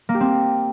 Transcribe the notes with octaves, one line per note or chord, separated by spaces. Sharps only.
A#3
G4
C4